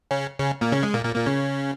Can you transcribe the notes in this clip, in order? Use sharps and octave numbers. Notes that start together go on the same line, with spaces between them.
C#3 C#4
C#3 C#4
A#2 A#3
C#3 C#4
G#3
A#2 A#3
A#2 A#3
A#2 A#3
C#3 C#4